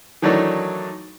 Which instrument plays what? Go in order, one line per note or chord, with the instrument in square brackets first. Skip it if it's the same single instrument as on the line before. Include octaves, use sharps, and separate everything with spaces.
[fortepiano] D#3 E3 F#3 A3 D4 D#4